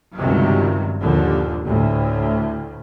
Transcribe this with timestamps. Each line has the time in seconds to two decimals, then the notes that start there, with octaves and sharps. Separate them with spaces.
0.16 C#2 G2 C3 D#3 F#3
1.02 D#2 A#2 D3 F3
1.66 D2 A2